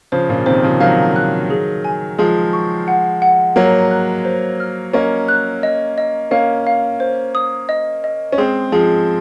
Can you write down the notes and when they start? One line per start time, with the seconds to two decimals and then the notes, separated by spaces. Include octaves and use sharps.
0.12 C#3 F3 C5
0.29 A#2 C#3
0.46 C3 D#3 C5
0.63 C#3 F3
0.80 D#3 F#3 F5
1.16 F#6
1.50 G#4
1.84 G#5
2.19 F3 G#3 G#4
2.53 C#6
2.88 F#5
3.22 F#5
3.56 F#3 A#3 C#5
3.91 F#6
4.25 C5
4.60 F6
4.93 A#3 C#4 D#5
5.28 F#6
5.63 D#5
5.98 D#5
6.31 A#3 C#4 F5
6.67 F5
7.00 C5
7.35 D#6
7.69 D#5
8.04 D#5
8.32 C#4
8.38 G#3 C4 G#4
8.72 F3 G#3 G#4